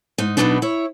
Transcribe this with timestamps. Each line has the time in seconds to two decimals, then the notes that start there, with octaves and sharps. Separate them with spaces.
0.18 G#2 D#4
0.37 B2 D#3 F#3 B3 D4 D#4
0.62 E4 C#5